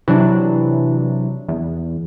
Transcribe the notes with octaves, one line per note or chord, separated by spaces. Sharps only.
C3 E3 F#3 D4
E2